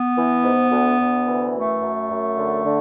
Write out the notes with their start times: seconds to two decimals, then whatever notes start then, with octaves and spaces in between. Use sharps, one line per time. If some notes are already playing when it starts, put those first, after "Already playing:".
Already playing: B3
0.16 E3
0.43 G#2
0.71 D2
0.99 D2
1.27 E3
1.54 F#2 A3
1.81 F#2
2.09 F#2
2.38 D3
2.64 D3